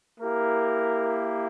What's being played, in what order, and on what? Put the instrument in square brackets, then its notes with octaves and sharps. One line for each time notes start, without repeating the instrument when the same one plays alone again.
[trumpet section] A#3 E4 G4 A#4